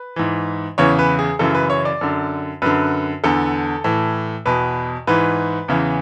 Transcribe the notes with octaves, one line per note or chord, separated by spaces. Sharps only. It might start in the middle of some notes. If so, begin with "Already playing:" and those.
Already playing: B4
G#2 E3
E2 C#3 E3 C#5
B4
G#4
F#2 C#3 E3 A4
B4
C#5
D5
F#2 D3
F#2 D3 B4
E2 D3 A4
A2 E3
E2 B2 B4
G#2 E3 B4
E2 C#3 E3